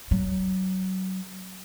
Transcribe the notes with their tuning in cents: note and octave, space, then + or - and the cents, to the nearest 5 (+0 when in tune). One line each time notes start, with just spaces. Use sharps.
F#3 +25